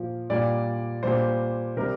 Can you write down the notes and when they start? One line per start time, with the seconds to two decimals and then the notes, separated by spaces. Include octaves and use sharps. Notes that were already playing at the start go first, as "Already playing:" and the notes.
Already playing: A#2 F3
0.30 A#2 G3 D5
1.03 A#2 G3 C5
1.76 C3 G3 A#4